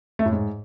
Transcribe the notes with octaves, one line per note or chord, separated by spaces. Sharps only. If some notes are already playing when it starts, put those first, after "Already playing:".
A3
A2
G#2